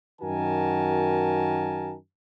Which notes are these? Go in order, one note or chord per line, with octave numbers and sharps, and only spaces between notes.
F#2 D#3 F#4 A#4 G#5 A5